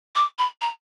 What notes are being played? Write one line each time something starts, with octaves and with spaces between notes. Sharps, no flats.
D6
B5
A#5